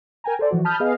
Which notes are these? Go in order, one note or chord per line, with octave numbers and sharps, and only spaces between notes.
A#4 G5 G#5 A#5
A4 C5 D5
E3 F3 F#4
A5 B5 D#6 F6 G6
B3 G#4 D#5 F5